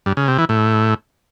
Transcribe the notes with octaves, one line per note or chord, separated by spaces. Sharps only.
G2
C#3
C3
E3
A2